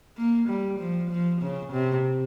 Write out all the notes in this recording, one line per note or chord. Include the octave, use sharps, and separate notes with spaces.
A#3
G3
F3
F3
C#3
C3